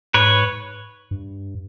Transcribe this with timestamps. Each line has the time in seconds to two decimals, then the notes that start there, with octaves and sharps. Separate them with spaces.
0.14 G#2 B4 C#5
1.11 G2